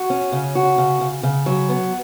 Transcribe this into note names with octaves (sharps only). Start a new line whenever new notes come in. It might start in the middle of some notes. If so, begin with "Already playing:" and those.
Already playing: F#4
C#4
C#3
F#4
C#3
C#3
C#3
F#3
B3